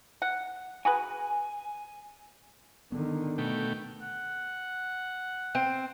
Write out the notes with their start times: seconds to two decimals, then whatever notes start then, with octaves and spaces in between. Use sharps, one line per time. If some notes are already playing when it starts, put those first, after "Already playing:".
0.22 F#5
0.85 F#4 G#4 B4 G#5
2.92 D3 D#3 B3 D4
3.38 B2 A3 G5
4.01 F#5
5.55 C4